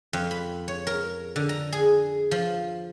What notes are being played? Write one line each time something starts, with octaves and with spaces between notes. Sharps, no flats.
F2
B5
C#5
A#4
D3
A#5
G#4
F3